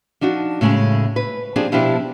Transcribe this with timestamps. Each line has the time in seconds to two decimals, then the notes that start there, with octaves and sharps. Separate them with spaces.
0.21 F3 D4 D#4 F#4
0.61 A2 C#3 G#3 A3 C#4
1.16 B4
1.56 F3 C4 D4 G4 G#4
1.72 B2 F3 D4 E4 F4 G4